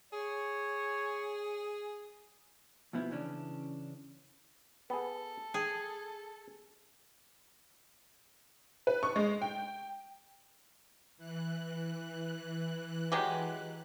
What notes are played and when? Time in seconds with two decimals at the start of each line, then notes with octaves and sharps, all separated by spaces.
0.13 G#4 C#5
2.93 D2 B2 F3 B3 E4
3.11 C#3 E3 C#4 D4
4.90 B3 G#4 A4
5.54 G#4 G5
8.87 B4
9.03 C#6
9.16 G#3
9.42 G5
11.17 E3 F#6
13.12 F#3 G#3 G4